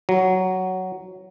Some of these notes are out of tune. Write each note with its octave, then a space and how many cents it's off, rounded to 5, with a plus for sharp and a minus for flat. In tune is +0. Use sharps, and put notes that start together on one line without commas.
F#3 +10